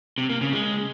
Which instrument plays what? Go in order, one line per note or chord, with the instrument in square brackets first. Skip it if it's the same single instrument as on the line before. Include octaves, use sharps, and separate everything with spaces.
[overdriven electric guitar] C3
A#3
C#3
G#3